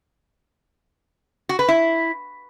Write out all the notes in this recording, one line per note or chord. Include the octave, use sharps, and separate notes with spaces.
F#4
B4
E4